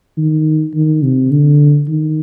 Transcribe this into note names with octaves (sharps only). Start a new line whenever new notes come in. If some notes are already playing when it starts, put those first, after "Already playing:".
D#3
D#3
C3
D3
D#3